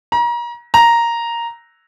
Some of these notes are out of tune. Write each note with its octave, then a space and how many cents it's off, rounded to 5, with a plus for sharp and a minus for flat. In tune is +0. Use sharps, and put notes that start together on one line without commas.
A#5 +35
A#5 +0